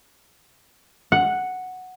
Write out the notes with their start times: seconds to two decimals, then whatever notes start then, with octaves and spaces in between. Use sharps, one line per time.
1.12 F#5